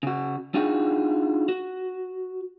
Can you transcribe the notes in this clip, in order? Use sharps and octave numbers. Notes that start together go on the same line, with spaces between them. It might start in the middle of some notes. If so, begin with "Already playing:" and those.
C#3 F#4
D4 D#4 F4 F#4 G#4 G5
F#4